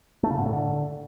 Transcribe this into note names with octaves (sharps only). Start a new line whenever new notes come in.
A3
C#3
G#2
A2
D3